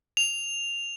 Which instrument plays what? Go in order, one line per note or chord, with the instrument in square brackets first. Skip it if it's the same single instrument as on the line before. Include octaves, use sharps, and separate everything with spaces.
[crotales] F7